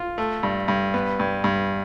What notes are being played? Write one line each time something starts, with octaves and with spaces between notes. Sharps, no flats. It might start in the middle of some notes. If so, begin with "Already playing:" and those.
Already playing: F4
A3
G2
G2
B3
G2
G2